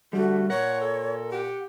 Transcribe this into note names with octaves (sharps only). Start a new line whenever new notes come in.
D3 G3 A3 F#4
A#2 A#4 C#5 F#5
A4
G4 F#5